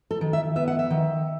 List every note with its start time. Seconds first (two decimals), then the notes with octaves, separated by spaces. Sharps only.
0.11 A4
0.21 D#3
0.33 E5
0.56 B3 E5
0.68 F#5
0.79 E5
0.90 D#3